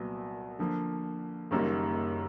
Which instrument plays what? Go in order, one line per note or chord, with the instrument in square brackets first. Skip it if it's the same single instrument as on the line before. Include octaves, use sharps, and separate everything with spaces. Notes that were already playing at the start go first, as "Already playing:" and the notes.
Already playing: [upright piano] C2 A#2 F#3 B3
D3 F3 A#3
F#1 F#2 D#3 G3 A#3